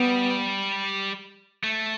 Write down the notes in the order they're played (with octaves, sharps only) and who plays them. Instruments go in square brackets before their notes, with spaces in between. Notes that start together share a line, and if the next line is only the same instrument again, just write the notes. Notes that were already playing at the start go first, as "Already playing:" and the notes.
Already playing: [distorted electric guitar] G3 [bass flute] B3
[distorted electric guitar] A3